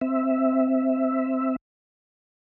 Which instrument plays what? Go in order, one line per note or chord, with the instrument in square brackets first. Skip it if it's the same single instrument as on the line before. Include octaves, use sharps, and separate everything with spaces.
[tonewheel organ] C4 E5